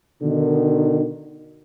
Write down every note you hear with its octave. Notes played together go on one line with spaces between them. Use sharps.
B2 D3 D#3